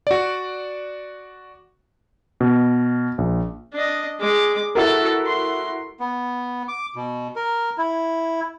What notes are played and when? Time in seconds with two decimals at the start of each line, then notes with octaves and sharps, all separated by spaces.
0.07 F#4 D5
2.40 B2
3.18 A#1
3.73 D4 D#5
4.19 G#3 D6
4.75 E4 F#4 A4 A#4
5.26 C6
6.00 B3
6.68 D6
6.96 B2
7.36 A#4
7.78 E4